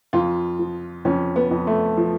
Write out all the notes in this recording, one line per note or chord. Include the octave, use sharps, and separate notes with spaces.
F2 F4
F3
F2 C#4
B3
F2
A3
F3